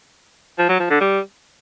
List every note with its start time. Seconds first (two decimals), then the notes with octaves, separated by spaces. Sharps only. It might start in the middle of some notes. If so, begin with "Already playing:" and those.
0.59 F3
0.69 F#3
0.80 F3
0.90 D3
1.01 G3